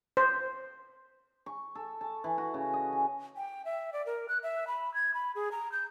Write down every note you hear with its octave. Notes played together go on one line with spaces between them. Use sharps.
C5
C#6
A4
A5
E3
F#4
C#3
D#5
G#5
G5
E5
D5
A#4
F#6
E5
B5
G#6
B5
G#4
A#5
G6